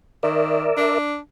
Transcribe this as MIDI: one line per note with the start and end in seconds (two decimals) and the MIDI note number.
0.23 0.67 51
0.23 0.98 70
0.23 0.98 74
0.23 0.98 76
0.77 1.17 62